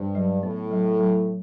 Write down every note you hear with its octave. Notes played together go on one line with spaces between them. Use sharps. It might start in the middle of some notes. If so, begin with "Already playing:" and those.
Already playing: G2 C5
F#3
A2 B3
F#3
F#3